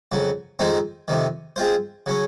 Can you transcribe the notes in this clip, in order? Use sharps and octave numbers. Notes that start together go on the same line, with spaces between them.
F2 C#3 F#3
F2 D#3 G#3 C4 D#4
F2 C3 D#3
G#3 C4 F4 C5
C#3 F#3 C#4